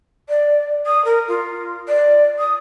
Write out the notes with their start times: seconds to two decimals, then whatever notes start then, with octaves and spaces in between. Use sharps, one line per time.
0.29 D5
0.86 D#6
1.05 A#4
1.28 F4
1.88 D5
2.39 D#6